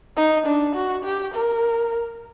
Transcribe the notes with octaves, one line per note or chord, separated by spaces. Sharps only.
D#4
D4
F#4
G4
A#4